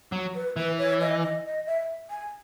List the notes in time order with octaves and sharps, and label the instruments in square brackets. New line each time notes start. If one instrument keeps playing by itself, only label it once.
[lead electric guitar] F#3
[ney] B4
[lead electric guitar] E3 [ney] B4
[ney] C#5
D#5
D#5
D#5
E5
G#5